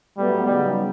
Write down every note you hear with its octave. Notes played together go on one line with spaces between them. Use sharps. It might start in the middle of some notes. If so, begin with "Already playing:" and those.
A2 F#3 G3 B3
C#3 F#3 G3 B3 D#4